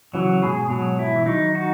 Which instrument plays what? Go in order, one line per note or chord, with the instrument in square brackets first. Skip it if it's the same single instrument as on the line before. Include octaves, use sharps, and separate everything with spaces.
[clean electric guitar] C#3 E3 [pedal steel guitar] F#3
[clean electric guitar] G#2 B2 [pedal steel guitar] G#4
[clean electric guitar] G#2 B2 [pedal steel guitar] F#3
[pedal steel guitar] E4
[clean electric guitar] E3
[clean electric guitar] D#3 F#3 [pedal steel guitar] D#4
[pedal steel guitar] F#4